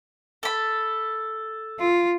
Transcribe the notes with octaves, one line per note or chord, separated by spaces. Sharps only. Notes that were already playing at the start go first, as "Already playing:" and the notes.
A4 B5
F4